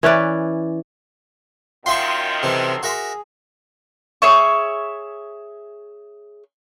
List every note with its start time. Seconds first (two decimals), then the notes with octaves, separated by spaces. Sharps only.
0.03 E3 C#4 B4 D5
1.86 F#2 D#3 F4 E5 G5 C6 C#6
2.43 C3 E3 A4
2.83 F#4 G#4 A#4 E5
4.22 G#4 C#5 E5 C#6